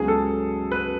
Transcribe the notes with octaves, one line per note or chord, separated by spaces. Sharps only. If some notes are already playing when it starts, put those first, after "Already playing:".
Already playing: C#2 C#3 F#3 B3 G#4
A4
B4